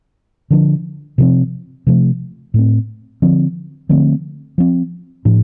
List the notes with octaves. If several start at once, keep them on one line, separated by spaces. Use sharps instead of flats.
D3 F3 D4
C3 F3 C4
C3 F3 A3
A2 A3 C4
D3 F3 C4
D3 F3 A3 C4
F3 C4
A2 F3 D4